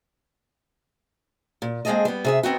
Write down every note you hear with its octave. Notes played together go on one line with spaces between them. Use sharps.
A#2
G#3 A#3 C4 G#4 A4 D#5
G3 B3
C3 G#4 E5
D#3 B3 C4 D#4 F#4